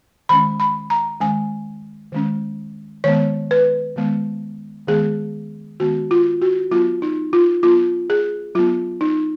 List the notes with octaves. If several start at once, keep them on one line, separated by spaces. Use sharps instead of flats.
D#3 G#3 C#4 B5
B5
A#5
D#3 G#3 C#4 G#5
D#3 G#3 C#4
D#3 G#3 B3 C#5
B4
D#3 G#3 B3
D#3 G#3 B3 G#4
D#3 G#3 B3 F#4
F4
F#4
F#3 B3 F4
D#4
F4
F#3 B3 F4
G#4
F#3 B3 F4
D#4